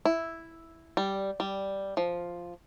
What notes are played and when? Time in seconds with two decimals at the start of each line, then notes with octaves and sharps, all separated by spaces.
0.05 E4
0.97 G3
1.40 G3
1.97 F3